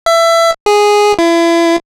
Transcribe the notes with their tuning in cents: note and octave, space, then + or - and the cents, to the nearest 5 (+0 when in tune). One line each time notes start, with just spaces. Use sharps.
E5 +20
G#4 -5
E4 +35